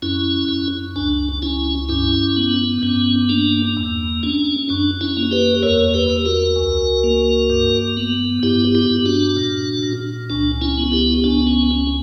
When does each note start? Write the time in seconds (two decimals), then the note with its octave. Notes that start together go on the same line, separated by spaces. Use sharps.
0.02 F#2 C#4 E4
0.49 F#2
0.96 C#2 D4
1.42 C#2 C#4 E4
1.89 G2 C#4 E4
2.37 B3
2.82 G2 C#4
3.29 A#3 D4
3.77 E2
4.23 C#4 D4
4.69 F#2 D4
5.01 C#4 E4
5.17 A#3
5.31 G4 B4
5.63 E2 A#4 C#5
5.94 G4 B4
6.10 E2
6.25 F#4 A#4
6.56 C#2
7.04 A#3
7.50 G2
7.97 B3
8.43 G2 E4 G4
8.75 E4 G4
8.90 G2
9.06 D4 F#4
9.37 A#2
9.83 A#2
10.30 C#2 D4
10.61 C#4 E4
10.78 B3
10.92 E4 G4
11.24 C#2 D4
11.47 C#4
11.71 C#4